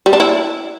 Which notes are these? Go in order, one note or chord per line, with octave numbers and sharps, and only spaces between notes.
G3
D4
E4